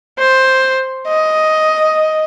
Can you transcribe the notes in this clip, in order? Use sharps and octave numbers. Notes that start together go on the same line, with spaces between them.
C5
D#5